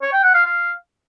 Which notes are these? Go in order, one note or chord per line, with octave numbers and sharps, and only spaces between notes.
C#5
G5
F#5
F5
F5